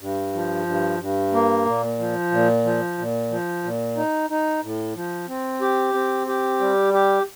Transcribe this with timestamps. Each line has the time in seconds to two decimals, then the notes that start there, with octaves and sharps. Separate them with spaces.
0.01 G2
0.34 F3
0.67 G2
1.00 G2
1.32 A#3
1.65 A#2
1.99 F3
2.31 A#2
2.65 F3
2.98 A#2
3.30 F3
3.64 A#2
3.96 D#4
4.30 D#4
4.63 A2
4.95 F3
5.28 C4
5.61 G4
5.94 C4
6.27 G4
6.60 G3
6.93 G4